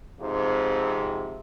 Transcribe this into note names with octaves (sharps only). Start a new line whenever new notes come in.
F2 G#2 C3